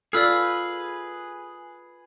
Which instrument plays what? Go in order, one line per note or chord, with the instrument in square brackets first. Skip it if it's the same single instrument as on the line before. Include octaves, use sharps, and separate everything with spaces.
[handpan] F4 A4 [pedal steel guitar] G#4 B4 [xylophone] D5 E6 F6